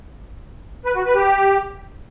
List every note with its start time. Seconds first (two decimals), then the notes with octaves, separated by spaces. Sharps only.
0.85 B4
0.95 F#4
1.05 B4
1.15 G4